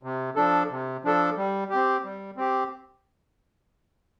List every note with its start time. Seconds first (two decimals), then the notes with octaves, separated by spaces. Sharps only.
0.03 C3
0.36 F3 D4 A4
0.70 C3
1.04 F3 D4 A4
1.37 G3
1.70 C4 G4
2.04 G3
2.37 C4 G4